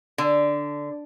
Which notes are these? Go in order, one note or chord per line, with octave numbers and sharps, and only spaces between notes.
D3